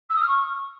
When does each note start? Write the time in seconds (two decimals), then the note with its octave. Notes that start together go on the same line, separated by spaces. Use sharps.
0.09 E6
0.15 D#6
0.21 F6
0.27 C#6